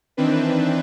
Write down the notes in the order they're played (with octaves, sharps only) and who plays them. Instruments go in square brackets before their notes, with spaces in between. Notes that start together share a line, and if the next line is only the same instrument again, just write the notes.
[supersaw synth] D#3 E3 C4 D4 B4